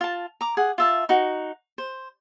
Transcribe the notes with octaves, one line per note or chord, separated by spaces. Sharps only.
F4 A5
A#5 D6
G#4 F#5
F4 E5 A5
D#4 F#4
C5